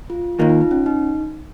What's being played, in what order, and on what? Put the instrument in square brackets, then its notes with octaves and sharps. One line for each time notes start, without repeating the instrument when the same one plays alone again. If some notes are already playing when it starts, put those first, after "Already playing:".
[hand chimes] F4
[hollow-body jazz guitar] D#2 D#3 A#3 [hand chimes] F4
[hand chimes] D#4
D#4
C#4
D#4